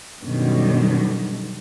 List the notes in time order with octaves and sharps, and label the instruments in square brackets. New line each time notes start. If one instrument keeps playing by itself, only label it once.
[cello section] F#2 B2 D3 D#3 G3